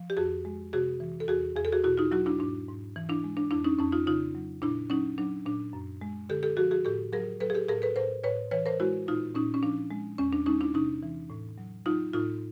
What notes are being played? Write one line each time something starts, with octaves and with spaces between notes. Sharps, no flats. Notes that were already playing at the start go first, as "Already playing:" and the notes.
Already playing: F3
G4
F2 F#4 G#4
G#3
C3 F#4 G#4
E3
A4
E2 F#4 G#4
E2 G#4
A4
F#4 G#4
B2 E4 F#4
D#4 F4
F#3 E4 F#4
D4 E4
G#2 D4
G#2
E3
D4 E4
G#3
D4
F2 D4 E4
C#4 D#4
F2 C#4 D#4
D#4 F4
C#3 D#4 F4
F#3
A#2 D4 E4
F#3 C#4 D#4
F#3 D4
A#2 D4
F#2
G#3
D3 G4 A4
G4 A4
F3 F#4 G#4
F#4 G#4
A2 G4 A4
F#3 G#4 A#4
F#3 A4 B4
G#4
G4 A4
A2 G#4 A#4
A4 B4
A2 A#4 C5
A2 B4 C#5
E3 B4 C#5
A#4 C5
G#3 E4 F#4
A#2 D#4 F4
A#2 C#4 D#4
C#4
F3 D4
G#3
E2 C#4
D4
G#3 C#4 D#4
D4 E4
C3 C#4 D#4
E3
A2
F#3
F#3 D#4 F4
A2 D#4 F4